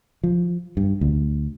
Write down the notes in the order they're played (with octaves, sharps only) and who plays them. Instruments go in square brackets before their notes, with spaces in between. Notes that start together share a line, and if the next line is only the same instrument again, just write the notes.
[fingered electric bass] F3
G2
D2